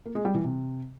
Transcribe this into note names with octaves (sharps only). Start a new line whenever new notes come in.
A#3
G#3
G3
E3
C3